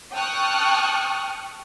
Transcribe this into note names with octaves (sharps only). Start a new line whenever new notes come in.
G5 A5 C#6 D#6 F6 F#6